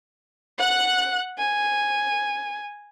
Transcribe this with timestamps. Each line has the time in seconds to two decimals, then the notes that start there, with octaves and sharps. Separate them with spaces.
0.58 F#5 F#6
1.38 G#5